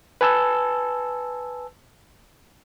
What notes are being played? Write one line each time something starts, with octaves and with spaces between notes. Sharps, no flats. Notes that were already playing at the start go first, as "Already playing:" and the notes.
B4 G#5 A5 E6